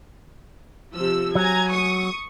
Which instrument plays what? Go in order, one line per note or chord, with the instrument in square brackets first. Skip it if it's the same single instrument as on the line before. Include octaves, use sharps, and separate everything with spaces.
[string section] C3 F3 E6
[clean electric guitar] F#3 [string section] G#5 A#5 G#6
[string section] C#6 D#6